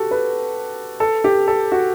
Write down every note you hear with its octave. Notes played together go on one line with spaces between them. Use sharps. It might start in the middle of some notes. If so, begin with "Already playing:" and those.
Already playing: F#4 G4 A4
B4
A4
G4
A4
F#4